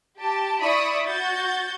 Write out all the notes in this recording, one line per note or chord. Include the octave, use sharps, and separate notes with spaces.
G4 A5
E4 D5 E5 B5 C#6 D#6
F#4 G6 A6